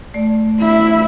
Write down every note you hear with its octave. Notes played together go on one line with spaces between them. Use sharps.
A3 D5
E4